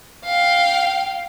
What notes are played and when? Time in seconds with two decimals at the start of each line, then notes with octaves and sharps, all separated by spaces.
0.25 F5 G5